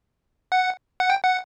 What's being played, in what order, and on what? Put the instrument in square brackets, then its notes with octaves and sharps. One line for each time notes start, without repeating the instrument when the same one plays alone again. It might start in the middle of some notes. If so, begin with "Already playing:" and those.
[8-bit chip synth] F#5
F#5
G5
F#5